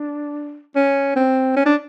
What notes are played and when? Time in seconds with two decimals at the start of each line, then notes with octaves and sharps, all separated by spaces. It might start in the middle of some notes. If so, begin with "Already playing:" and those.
Already playing: D4
0.75 C#4
1.16 C4
1.56 C#4
1.65 D4